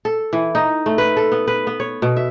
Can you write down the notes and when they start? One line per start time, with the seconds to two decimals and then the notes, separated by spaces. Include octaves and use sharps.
0.05 A4
0.33 E3
0.55 D#4
0.86 A3
0.98 B4
1.17 A4
1.32 B3
1.48 B4
1.67 B3
1.80 C#5
2.02 B2
2.17 E5